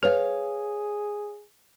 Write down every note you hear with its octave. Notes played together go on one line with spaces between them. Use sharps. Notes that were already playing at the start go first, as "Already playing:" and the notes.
G#4 B4 C#5 F5